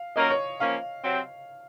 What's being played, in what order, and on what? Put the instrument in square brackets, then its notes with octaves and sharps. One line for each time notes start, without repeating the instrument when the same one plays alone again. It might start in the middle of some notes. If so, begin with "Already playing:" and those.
Already playing: [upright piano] F5
[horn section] F#3 A#3 C#4 F4 A#4 [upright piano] D#5
[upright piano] C#5
[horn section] F3 A#3 C#4 [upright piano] F5
[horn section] C3 F#3 C4